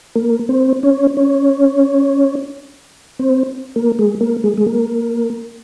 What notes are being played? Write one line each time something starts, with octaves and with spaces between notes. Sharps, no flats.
A#3
C4
C#4
C#4
C4
A#3
G#3
A#3
G#3
G#3
A#3